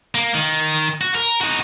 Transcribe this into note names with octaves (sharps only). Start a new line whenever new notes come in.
A#3
D#3
F#4
A#4
D#4 F#4